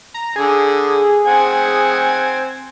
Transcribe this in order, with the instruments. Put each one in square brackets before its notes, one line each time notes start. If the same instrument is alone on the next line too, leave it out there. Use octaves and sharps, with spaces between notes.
[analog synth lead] A#5
[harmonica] D3 [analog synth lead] G#4
[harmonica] C4 F#5 G#5